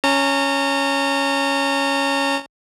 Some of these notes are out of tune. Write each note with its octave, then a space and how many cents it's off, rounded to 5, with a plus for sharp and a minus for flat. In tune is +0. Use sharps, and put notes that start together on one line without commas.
C#4 +0 A#5 -35